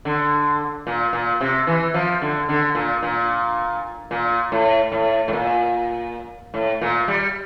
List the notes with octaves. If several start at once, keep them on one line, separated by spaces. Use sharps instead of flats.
D3
A#2
A#2
C3
E3
F3
D3
D3
A#2
A#2
A#2
A2
A2
A2
A#2
A2
A#2
G3